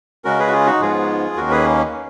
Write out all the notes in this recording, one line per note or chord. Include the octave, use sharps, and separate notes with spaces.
C#3 G#3 C#4 F#4 A#4
G#4 B4
F#4
F4 G#4
D#4 F#4
G#2 F3 G#3 B3 F4 G#4
D#2 D#3 A#3 C#4 F#4 A#4
G#4 B4